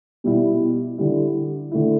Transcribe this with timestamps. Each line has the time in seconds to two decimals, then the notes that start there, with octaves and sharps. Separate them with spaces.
0.24 B2 G3 E4
0.98 D3 G3 E4
1.72 D3 A3 E4